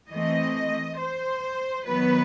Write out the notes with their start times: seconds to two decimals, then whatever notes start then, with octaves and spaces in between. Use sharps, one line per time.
0.10 E3 A3 C4 D#5
0.99 C5
1.87 D#3 F#3 B3 B4